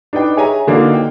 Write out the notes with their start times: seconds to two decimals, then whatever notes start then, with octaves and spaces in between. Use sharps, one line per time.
0.13 D4 D#4 B4 G5
0.37 G#4 C#5 E5 G#5 A#5
0.67 D3 E3 F#3 A#3 D4 D#4
0.94 G5